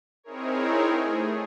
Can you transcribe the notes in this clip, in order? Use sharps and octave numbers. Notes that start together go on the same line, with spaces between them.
C4 D#4 E4 G#4 A#4 C#5
A3 G#4